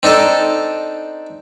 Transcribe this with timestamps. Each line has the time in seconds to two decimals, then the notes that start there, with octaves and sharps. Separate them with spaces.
0.03 C4 D4 D#4 A4